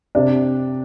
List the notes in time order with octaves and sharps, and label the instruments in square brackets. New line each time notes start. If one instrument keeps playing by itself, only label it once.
[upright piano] C3 D4